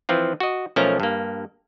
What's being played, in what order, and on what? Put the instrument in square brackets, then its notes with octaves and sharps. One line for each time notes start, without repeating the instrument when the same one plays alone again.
[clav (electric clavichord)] E3 F3 C4 F4
F#4 D#5
B1 F3 A3 C#4 A#4 A#5
G2 A#3